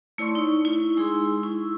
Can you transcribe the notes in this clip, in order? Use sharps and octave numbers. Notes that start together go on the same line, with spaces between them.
A3 E4 C#5 D5 C6 C#6
D#4
E4
G#3 D#4 G#4 C6 E6
E4 C#6 E6